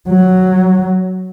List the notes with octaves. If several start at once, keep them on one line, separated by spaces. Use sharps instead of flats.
F#3